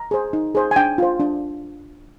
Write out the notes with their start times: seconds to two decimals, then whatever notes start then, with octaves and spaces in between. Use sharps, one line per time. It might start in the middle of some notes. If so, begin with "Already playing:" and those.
Already playing: A#5
0.11 G#4 C5
0.33 D#4
0.55 G#4 C5
0.71 G#5
0.76 D4 G5
0.98 F4 C5
1.20 D4